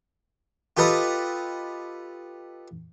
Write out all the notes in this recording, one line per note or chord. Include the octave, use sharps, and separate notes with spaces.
F4 G4 A4 B4 D#5